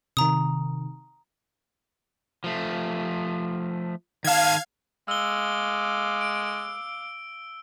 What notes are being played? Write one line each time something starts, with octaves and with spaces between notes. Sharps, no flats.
C3 D#3 A#5 D#6
F3 A3
D#3 F5 A5 G#6
G#3 F5 D6 E6 G7
D7